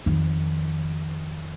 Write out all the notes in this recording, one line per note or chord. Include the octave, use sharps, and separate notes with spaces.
F2 D#3